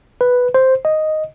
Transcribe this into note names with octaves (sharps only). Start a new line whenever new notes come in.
B4
C5
D#5